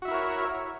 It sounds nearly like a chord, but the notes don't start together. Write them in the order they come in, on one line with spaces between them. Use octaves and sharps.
F#4 E5 E4 A#4 C#5